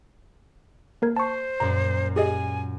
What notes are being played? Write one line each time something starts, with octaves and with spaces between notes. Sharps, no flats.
A#3 A#4 G#6
C5 A5 C#6
F#2 A#2 A#5
G4 G#4 D#5 G#5